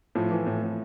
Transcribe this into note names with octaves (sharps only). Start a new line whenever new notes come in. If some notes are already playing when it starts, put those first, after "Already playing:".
A2 F3
E3
A2
A2